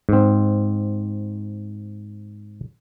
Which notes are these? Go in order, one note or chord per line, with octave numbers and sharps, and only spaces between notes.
G#2 C4